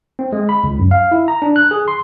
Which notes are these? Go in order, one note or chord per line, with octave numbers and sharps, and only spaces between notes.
C4
G#3
B5
C#2
F#2
F5
E4
A#5
D4
F#6
G#4
C6